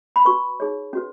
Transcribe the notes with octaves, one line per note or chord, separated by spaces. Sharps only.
B5
F#4 B4 C#6
D#4 G#4 C#5
C#4 F#4 B4